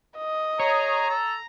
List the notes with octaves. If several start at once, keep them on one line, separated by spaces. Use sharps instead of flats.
D#5
G#4 C#5 A#5
A4